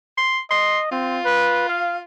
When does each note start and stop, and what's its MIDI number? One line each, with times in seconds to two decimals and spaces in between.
0.17 0.39 84
0.51 0.89 75
0.51 0.79 84
0.92 1.19 60
0.92 2.02 65
1.26 1.67 71
1.69 1.96 77